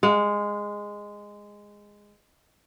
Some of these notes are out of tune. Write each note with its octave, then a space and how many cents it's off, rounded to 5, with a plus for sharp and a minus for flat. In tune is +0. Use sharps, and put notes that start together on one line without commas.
G#3 -10 F5 +45